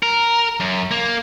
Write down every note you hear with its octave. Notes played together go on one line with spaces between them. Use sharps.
A#4
F#2
A#3